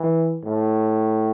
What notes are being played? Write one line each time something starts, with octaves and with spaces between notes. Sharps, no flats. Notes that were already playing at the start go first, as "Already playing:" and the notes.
Already playing: E3
A2